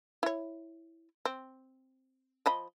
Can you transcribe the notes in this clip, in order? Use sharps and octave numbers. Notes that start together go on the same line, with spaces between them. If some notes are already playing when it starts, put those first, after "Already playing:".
E4 C#5
C4
F3 D#5 B5